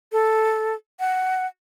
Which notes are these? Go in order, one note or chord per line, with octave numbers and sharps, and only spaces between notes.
A4
F#5